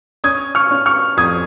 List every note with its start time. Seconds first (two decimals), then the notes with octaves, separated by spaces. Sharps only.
0.24 C#4 D#6 G#6
0.55 C#6 F6
0.71 C#4
0.86 C#6 F6
1.17 F2 D#6 G#6